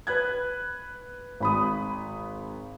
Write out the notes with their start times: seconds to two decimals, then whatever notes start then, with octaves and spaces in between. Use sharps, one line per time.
0.07 B4 F#6 G#6
1.40 G#1 B5 D#6